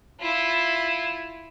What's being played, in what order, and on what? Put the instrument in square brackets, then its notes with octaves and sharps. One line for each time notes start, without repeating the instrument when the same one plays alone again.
[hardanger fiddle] E4 F4